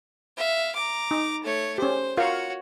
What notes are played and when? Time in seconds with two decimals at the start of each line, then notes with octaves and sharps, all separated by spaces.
0.37 E5 F5
0.75 A#5 D6
1.11 D#4
1.43 A3 C#5
1.78 C#4 G4 C5
2.17 F4 F#4 A#4 C#5 F5